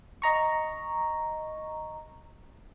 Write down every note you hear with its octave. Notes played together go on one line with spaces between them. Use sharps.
D#5 A#5 C#6